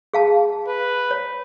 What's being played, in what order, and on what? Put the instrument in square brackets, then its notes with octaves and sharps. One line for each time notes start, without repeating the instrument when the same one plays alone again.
[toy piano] G#4 F5 A5
[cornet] B4
[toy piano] C#5